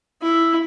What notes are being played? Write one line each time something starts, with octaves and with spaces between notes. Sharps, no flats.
E4